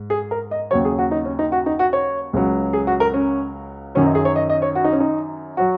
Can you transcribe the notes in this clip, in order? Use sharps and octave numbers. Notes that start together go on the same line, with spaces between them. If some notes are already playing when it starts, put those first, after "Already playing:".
Already playing: G#2
G#4
A#4
D#5
D#2 C#3 F#3 C#5
G#4
F#4
D#4
C#4
D#4
F#4
D#4
F#4
C#5
C#2 C#3 F#3
G#4
F#4
A#4
C#4
F#2 D#3 F#3 C#4
D#4
G#4
C#5
D#5
D#5
C#5
F#4
D#4
C#4
D#4
F#3 F#4